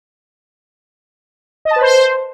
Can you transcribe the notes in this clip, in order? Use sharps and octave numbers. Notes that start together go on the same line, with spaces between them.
D#5
A5
B4
C5